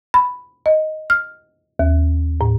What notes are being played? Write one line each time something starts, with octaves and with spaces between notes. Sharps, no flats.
B5
D#5
F6
D#2
A2